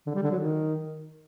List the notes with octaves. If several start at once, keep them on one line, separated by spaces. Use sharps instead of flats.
D3
G3
D3
F#3
D#3